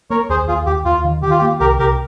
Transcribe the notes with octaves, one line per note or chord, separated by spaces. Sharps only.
A#3 A#4 C#5
D#2 G#4 C5
D#2 F4 G#4
D#2 G4
D#2 F4
D#3
D#3 G4
F4
G4
A#3
C2 G4 A#4
C2 G4 A#4